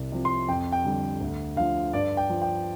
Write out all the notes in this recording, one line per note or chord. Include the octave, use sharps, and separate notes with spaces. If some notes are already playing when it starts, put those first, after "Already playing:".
Already playing: C2
C3 F3
C6
F2 G5
G5
D3 G3
D2
D3 F3 F5
G2 D5
G5
F3
G5